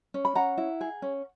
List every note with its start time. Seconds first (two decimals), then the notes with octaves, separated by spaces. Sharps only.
0.14 C#4
0.25 B5
0.35 C#4 F#5 A#5
0.57 E4
0.81 G#4
1.02 C#4